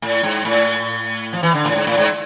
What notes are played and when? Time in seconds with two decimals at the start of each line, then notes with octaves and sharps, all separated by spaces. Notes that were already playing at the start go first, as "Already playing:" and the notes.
0.02 A2
0.23 G#2
0.45 A2
1.33 F3
1.43 E3
1.54 D3
1.65 A2
1.76 G#2
1.87 A2
1.98 G#2